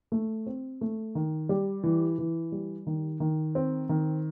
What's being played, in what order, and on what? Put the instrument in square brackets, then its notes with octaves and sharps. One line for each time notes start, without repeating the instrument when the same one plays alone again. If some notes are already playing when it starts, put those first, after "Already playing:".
[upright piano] A3
C4
A3
D#3
G3
E3
E3
G3
D#3
D#3
C4
D#3